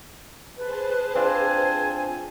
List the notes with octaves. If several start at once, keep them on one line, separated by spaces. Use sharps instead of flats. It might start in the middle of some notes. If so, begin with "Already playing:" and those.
G#4 B4 C5 A5
C4 D4 F4 G#5